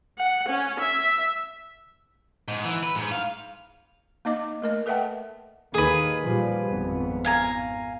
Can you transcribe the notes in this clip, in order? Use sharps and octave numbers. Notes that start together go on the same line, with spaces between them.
F#5
C#4
E5
G#2
E3
B4
G#2
F5
A#3 D#4 D#5 D6
A3 A#4 D#5
A4 B4 E5 F#5 G5 A5
D#2 D#3 A#3 G#4 B4
A#2 F3 G3
G#1 F2 B3
F5 G#5 A#5